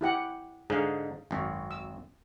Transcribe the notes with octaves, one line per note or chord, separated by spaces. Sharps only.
E4 G4 F#5
G#2 D3 D#4 G#4 F5
G#1 F#2
E6